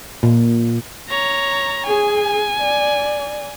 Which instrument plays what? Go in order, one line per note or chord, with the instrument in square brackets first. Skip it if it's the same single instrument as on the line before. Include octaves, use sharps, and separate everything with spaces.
[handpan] A#2
[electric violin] C#5 A#5
[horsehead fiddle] G#4 [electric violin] G#5
[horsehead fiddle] D5